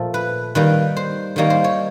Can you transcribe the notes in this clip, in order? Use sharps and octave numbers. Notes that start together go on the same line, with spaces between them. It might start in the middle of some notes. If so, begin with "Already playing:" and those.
Already playing: A#2 F3 A3 A4
B4
D#3 G3 A#3 D#4 B4
C5
D#3 G3 A#3 D#4 C#5
C5
C#5